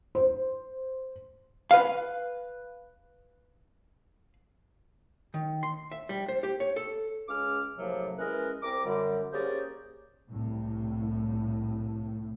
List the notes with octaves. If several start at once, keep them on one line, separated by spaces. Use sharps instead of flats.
C5
B4 F5
D#3
C6
E5
G3
C5
G4
C#5
A4
C#2 C#3 C#4 G#4 D6 F6
F#2 A2 C3 F3 F#3 A#3
E3 G#3 C#4 A#4 B4 D#5
C2 C4 A#5 D6
F#2 D3 G3
A#3 C#4 G4 G#4 C5 D5
C2 A2